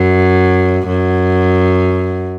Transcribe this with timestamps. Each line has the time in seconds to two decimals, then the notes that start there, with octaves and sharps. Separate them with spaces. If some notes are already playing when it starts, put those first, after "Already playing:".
Already playing: F#2
0.87 F#2